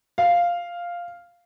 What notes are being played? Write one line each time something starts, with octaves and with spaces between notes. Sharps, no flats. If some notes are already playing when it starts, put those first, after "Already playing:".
F5